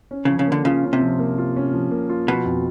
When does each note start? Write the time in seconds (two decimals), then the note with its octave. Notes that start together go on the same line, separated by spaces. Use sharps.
0.11 C#4
0.25 C#3 F3
0.39 C#3
0.47 D3 A#3
0.65 C#3 F4
0.83 C#4
0.93 C3
1.02 F3
1.19 A#3
1.38 F4
1.56 C#4
1.73 F3
1.91 A#3
2.10 F4
2.28 B2 F3
2.46 F2